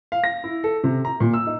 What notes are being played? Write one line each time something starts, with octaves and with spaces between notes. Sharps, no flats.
F5
A#6
E4
A4
C3
A#5
A#2
E6
D#4